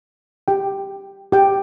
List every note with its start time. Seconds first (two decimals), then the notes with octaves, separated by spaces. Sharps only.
0.48 G4 G5
1.32 G4 G5